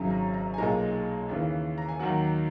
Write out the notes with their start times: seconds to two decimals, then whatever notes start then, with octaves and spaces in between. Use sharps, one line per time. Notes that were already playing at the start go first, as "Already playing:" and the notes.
Already playing: G#1 F#2 C#3 F#3
0.10 A#5
0.34 A#5
0.54 G#5
0.58 B1 A#2 G#3 A#5
1.29 D#2 C#3 E3
1.78 A#5
1.88 G#5
1.99 D#2 D#3 F#3 F#5